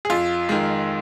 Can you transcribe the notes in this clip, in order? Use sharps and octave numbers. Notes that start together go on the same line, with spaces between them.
G#4
F2 F4
D#3 G#3